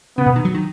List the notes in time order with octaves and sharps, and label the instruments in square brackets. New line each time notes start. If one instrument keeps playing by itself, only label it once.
[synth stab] C#3 [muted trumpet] B3
[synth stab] B2
D#3
F#3
D#3